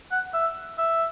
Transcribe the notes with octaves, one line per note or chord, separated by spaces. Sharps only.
F#5
E5
E5